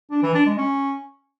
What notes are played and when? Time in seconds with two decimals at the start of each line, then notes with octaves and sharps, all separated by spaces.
0.11 D4
0.22 E3
0.34 D4
0.46 G#3
0.58 C#4